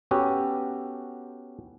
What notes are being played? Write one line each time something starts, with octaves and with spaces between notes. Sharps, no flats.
B3 C#4 F#4 G4 A4